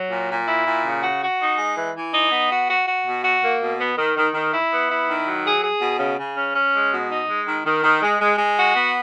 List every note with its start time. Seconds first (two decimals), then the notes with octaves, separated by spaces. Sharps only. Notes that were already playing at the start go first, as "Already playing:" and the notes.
Already playing: F#3
0.10 A#2
0.30 A#2
0.48 E4
0.66 A#2
0.85 C#3
1.03 F#4
1.21 F#4
1.40 D#4
1.58 G#3
1.76 E3
1.95 E3
2.14 D#4
2.31 B3
2.50 F#4
2.69 F#4
2.87 F#4
3.06 B2
3.24 F#4
3.42 A#3
3.61 B2
3.79 B3
3.97 D#3
4.16 D#3
4.34 D#3
4.53 E4
4.71 B3
4.90 E4
5.07 D#3
5.25 F#3
5.44 G#4
5.63 G#4
5.81 B2
5.99 C#3
6.18 C#3
6.36 C#4
6.54 C#4
6.73 G#3
6.91 B2
7.10 D#4
7.28 G#3
7.47 D#3
7.66 D#3
7.83 D#3
8.02 G#3
8.20 G#3
8.38 G#3
8.58 F#4
8.76 B3